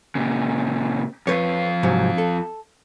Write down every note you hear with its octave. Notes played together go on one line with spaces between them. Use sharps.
A#2 C#3
F2 F4 B4 C#5
G#2 C3 F#3
A4